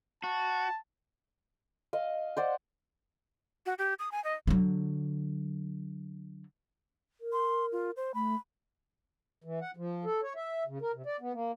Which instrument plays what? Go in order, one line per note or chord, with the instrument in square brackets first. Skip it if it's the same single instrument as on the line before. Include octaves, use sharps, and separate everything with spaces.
[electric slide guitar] F#4 [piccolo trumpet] A5
[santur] D#5 F5
C5 D5 F#5
[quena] F#4
G4
D#6
G#5
D#5
[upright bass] D3 F#3
[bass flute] A#4
[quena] C6
F4
C5
[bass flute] A3 [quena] B5
[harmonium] E3
F#5
F3
A4
C#5
E5
C#3
A#4
C3
D5
B3
A#3